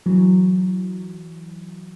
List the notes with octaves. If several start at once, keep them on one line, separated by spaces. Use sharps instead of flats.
E3 F#3